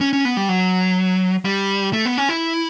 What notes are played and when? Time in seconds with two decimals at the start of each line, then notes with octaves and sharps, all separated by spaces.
0.01 C#4
0.13 C#4
0.25 B3
0.37 G3
0.49 F#3
1.45 G3
1.93 A3
2.06 B3
2.17 C#4
2.29 E4